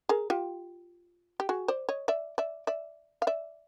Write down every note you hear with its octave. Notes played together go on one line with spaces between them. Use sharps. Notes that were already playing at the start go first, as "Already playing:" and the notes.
G#4 A#4
F4 G4
G4
F#4 G#4
C5 D5
C#5 D#5
D5 E5
D5 E5
D5 E5
F5
D5 E5